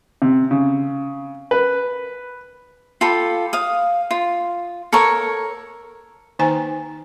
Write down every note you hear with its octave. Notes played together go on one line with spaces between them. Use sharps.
C3
C#3
B4
F4 G4 A4 B5
F5 D#6
F4
A4 A#4 C#5 C#6
D#3 A#3 D#4 C5 G#5 A#5